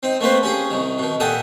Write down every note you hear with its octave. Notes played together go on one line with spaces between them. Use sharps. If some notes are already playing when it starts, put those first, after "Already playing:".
C4 D#4
A3 A#3 C4 B4 C5
C#4 G4 G#4
C2 D#3
B2 D#3
A#2 G4 A4 F#5 G#5 D#6